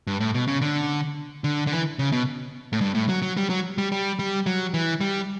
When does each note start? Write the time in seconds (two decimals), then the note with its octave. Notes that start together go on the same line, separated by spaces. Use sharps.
0.07 G2
0.20 A2
0.34 B2
0.48 C#3
0.62 D3
1.44 D3
1.67 D3
1.72 E3
1.99 C#3
2.12 B2
2.73 A2
2.81 G2
2.95 A2
3.09 F#3
3.22 F#3
3.37 G3
3.50 F#3
3.78 G3
3.92 G3
4.19 G3
4.46 F#3
4.74 E3
5.01 G3